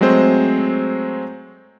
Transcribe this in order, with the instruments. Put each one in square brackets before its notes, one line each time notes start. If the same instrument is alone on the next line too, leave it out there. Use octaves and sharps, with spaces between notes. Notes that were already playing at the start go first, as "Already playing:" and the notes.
[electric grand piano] F#3 G#3 A3 C4 C5